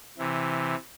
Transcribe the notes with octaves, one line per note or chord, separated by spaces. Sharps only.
C3 E3